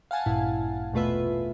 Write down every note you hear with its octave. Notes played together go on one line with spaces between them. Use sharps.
F5 F#5 G#5 A5
A1 G2 A#2 E4
E2 B2 A3 F4 B4 E5